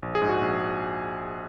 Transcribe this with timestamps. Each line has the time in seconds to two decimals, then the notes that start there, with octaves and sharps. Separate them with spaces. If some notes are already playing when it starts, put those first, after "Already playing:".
0.02 A#1
0.15 G#4
0.22 G#2
0.29 F#4
0.41 A#1